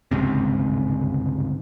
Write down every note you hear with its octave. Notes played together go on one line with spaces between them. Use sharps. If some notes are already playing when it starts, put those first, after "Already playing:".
G1 C#2 G#2 C3